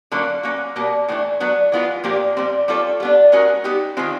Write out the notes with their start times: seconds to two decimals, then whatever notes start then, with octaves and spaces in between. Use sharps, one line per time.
0.11 D3 F#3 A#3 C#4
0.43 A#3 C#4 F#4
0.76 B2 G3 A#3
1.08 A2 E3 A3 D4
1.40 F#3 B3 D4
1.72 E3 G#3 B3 D4 F4
2.04 A#2 F3 A#3 D4 G4
2.37 A#2 G3 C4
2.68 G3 C4 F4 A4 C#5
3.00 G3 B3 D4
3.32 G#3 C#4 F#4 A#4
3.64 G3 B3 D#4 G4
3.97 D#3 G#3 C4 F4